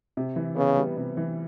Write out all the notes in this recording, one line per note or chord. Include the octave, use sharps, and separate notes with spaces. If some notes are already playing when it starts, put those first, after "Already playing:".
C3
E3
C#3 B3
G3
C3
E3